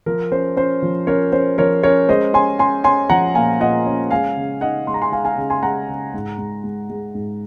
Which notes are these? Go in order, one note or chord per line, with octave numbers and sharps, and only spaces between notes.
F3 A#4
C#4 C5
C#4 C5
F3
C#4 A#4 C#5
C#4 C5
F3 A#4 C#5
C#4 A#4 C#5
G#3 C5 D#5
C#4 G#5 C6
C#4 G#5 C6
C#4 G#5 C6
F3 F#5 A#5
A#2 F5 G#5
A#2 D#5 F#5
C#4
G#3 F5 G#5
C#3
D#4 D#5 F#5
G#3 C6
A#5
G#5 C6
G#3 F5 G#5
F5 G#5
C#3
G#5 C6
G#3 F#5 A#5
C#3
G#2
G#2
G#3
G#3
G#2